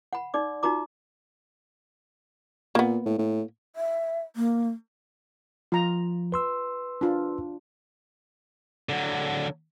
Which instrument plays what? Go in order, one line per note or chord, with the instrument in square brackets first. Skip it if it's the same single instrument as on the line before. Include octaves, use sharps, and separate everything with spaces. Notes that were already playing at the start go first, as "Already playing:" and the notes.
[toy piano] F#5 B5
D#4 D5 D6
D#4 F4 F#4 A#5 D6
[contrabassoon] A#2 [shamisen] A#3 B3
[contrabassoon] A2
A2
[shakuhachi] E5
A#3
[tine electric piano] F3 [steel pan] F4 A#5
[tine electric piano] B4 C6 E6
[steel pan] D4 F4
[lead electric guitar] D3 F#3